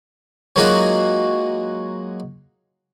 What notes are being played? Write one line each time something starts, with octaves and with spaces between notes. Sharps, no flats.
F#3 G#3 A#3 D#4 F4 F#4